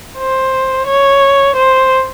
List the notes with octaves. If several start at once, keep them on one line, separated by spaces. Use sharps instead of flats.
C5
C#5
C5